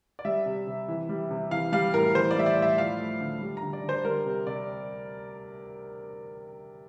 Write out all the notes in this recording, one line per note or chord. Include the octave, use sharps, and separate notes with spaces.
D5
G3 E5
C3
C3
E3
G3
C3
E3 F5
G3 F5
A2 A#4
E3 C5
D5
G3 E5
D5
A2
E5
F3 F5
A3
D3
G3
A#5
D3
D5
D3
C5
G3 A#4
C3
C3 D5